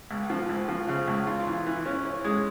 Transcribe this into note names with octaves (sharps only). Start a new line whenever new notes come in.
C#2
F3
C#2
F3
C#3
C#2
F4
E3
E3
C#4
C#4
G#3